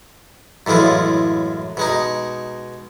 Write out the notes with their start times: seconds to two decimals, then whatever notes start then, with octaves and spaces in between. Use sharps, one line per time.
0.66 F#2 A2 E3 G#3 F4
1.77 B2 G#3 D#4